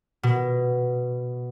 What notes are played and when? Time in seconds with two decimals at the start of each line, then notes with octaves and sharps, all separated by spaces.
0.23 B2